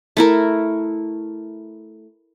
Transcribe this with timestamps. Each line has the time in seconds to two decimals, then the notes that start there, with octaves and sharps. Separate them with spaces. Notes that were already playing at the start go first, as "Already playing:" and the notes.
0.17 A3 E4 A#4